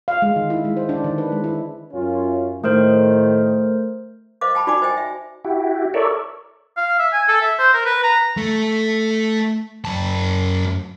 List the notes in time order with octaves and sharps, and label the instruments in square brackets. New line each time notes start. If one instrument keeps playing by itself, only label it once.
[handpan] F5
G#3
D#3
E4
G#3
C5
D4
D#3
B4
G#3
E4
[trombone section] F#2 C#4 F4
[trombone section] A2 D#3 [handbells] A3 A#4 C5
[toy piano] C5 D#5 F5 D6
G5 A5 B5
D#4 F#4 D5 G#5 B5 D6
C5 D#5 G5 G#5
E5
[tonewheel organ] E4 F#4 G4
A4 A#4 C#5 D5 E5
[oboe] F5
E5
G#5
A4
E5
C5
A#4
B4
A#5
[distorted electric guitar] A3
F#2 A5